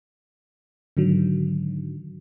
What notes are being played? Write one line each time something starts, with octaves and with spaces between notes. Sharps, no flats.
G#2 D3 D#3 F#3